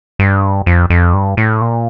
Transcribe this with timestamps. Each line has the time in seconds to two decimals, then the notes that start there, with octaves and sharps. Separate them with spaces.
0.19 G2
0.66 F2
0.90 F2
1.14 G2
1.37 A2
1.61 A#2